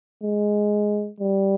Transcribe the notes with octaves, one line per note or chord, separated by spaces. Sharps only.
G#3
G3